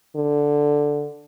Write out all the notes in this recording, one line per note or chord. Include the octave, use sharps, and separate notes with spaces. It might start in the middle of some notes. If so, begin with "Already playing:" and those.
D3